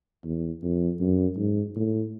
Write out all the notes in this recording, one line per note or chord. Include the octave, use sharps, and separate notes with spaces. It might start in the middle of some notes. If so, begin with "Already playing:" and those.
E2
F2
F#2
G#2
A2